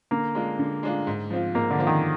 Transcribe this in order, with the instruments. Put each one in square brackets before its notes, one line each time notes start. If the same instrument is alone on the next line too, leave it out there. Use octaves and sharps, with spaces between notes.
[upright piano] D3 [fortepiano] A#3
[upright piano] G#3 D4 F4
D3
G#3 D4 F4
G#2
F3 C4 F4
[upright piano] G#2 [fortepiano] A#3
[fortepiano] D3
[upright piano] F3 C4 F4
[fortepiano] D#3